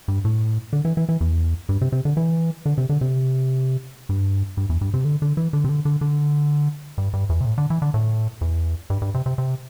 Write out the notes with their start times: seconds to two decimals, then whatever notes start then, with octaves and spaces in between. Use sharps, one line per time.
0.08 G2
0.25 A2
0.73 D3
0.85 E3
0.97 E3
1.09 E3
1.21 E2
1.69 G2
1.81 C3
1.92 C3
2.05 D3
2.17 E3
2.66 D3
2.78 C3
2.89 D3
3.01 C3
4.09 G2
4.57 G2
4.69 E2
4.81 G2
4.94 C3
5.05 D3
5.22 D3
5.37 E3
5.53 D3
5.64 C3
5.69 D3
5.85 D3
6.01 D3
6.98 G2
7.13 G2
7.29 E2
7.41 C3
7.46 A2
7.58 D3
7.70 E3
7.82 D3
7.94 A2
8.41 E2
8.90 G2
9.02 G2
9.14 C3
9.26 C3
9.38 C3